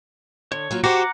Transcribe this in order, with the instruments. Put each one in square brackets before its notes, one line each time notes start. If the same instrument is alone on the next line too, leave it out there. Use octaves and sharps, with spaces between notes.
[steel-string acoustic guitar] D3 [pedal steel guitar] C#5
[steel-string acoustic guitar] F#3 A#3 F4
[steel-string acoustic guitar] F#4 G4 C5 [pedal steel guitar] F#5 A#5 D6